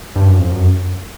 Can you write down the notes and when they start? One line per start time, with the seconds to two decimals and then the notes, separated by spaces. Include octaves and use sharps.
0.16 G2
0.28 F#2
0.39 F2
0.51 F#2